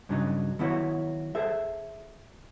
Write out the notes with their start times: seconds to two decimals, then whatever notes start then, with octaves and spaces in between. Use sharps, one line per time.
0.09 G2 C#3 F#3 D4 D#4
0.59 D#3 F#3 B3 E4 F#4 C#5
1.35 G#4 A4 C5 E5